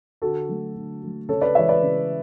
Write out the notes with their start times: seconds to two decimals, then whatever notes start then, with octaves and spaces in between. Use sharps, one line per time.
0.22 D3 F#4 A4
0.49 F#3 A3
0.75 D3
1.02 F#3 A3
1.29 C#3 A4 C#5
1.42 B4 D5
1.55 E3 G#3 C#5 E5
1.69 B4 D5
1.83 C#3